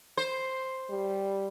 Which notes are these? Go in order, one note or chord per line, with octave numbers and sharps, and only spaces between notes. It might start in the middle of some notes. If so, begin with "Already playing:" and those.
C5
G3